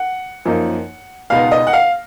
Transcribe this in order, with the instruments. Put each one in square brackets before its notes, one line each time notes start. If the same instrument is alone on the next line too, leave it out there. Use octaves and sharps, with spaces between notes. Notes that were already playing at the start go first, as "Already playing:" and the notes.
Already playing: [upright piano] F#5
F#2 F3 A#3 D#4
C#2 B2 G#3 B3 D#4 F5
D#5
F#5
F5